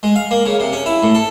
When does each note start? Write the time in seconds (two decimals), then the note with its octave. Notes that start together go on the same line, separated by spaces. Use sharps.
0.03 G#3
0.16 F5
0.31 A#3
0.46 C#3
0.60 C3
0.73 C#4
0.86 E4
1.03 A2
1.15 A4